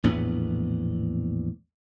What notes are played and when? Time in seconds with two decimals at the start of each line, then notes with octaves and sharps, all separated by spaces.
0.03 A#1 E2 A2 B3